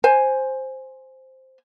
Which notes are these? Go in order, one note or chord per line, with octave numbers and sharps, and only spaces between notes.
C5 G#5